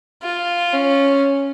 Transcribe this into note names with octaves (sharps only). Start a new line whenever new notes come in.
F4
C#4